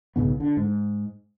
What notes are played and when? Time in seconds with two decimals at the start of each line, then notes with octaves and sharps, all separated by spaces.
0.16 B1 G#2 C#3 B3
0.40 D3
0.57 G#2